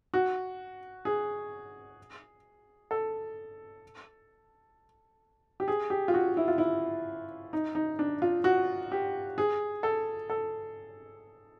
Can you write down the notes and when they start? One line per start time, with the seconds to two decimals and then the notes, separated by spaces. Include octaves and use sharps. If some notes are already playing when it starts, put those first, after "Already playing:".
0.14 F#4
1.05 G#4
2.91 A4
5.60 G4
5.68 G#4
5.90 G4
6.08 F4
6.14 F#4
6.37 E4
6.48 F4
6.58 E4
7.53 D#4
7.75 D#4
7.99 D4
8.22 F4
8.44 F#4
8.92 G4
9.38 G#4
9.83 A4
10.30 A4